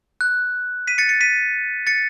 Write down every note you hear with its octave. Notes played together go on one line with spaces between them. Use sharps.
F#6
B6 D#7
A6 C#7
A6 C#7
B6 D#7
A6 C#7